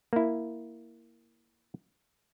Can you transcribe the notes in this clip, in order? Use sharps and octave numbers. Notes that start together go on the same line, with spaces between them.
A#3 E4